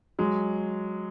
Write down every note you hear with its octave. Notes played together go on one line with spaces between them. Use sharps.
F#3 G#3